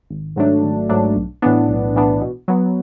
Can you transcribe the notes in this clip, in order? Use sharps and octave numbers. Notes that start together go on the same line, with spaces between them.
G#1
G#2 F#3 A3 D4
G#1
G#2 F#3 A3 D4
B1
A2 E3 B3 D4
B1
A2 E3 B3 D4
B2
F#3 B3